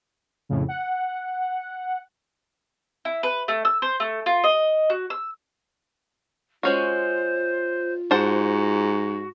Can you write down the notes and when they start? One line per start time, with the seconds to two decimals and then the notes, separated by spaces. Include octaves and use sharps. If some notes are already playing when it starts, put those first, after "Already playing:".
0.49 F2 A2 C#3
0.68 F#5
3.05 E4
3.23 B4
3.48 A3
3.65 E6
3.82 C5
4.00 A3
4.26 F4
4.44 D#5
4.90 F#4
5.10 E6
6.63 G#3 C#4 F4 F#4 C5
8.11 G#2 F#4 C5 F#5 A5